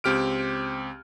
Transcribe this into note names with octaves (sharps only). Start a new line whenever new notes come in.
C#2 C4 G4 F6 D7